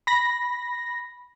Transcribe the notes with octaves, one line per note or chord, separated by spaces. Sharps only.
B5 A#6